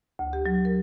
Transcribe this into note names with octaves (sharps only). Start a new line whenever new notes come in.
D2
G4
F#3
A#4